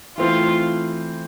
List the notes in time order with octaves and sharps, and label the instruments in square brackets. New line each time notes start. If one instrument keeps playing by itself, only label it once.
[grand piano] E3 A3 C4 [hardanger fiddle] F4